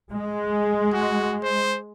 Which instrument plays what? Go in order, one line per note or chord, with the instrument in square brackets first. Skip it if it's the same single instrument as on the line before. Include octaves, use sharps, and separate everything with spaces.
[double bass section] G#3
[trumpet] F#4
C5